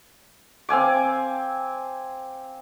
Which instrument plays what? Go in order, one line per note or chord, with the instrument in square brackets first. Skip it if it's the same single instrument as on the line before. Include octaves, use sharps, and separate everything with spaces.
[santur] C4 F5 G#5 D6